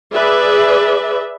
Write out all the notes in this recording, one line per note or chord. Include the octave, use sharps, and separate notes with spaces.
G#4 B4 D5 E5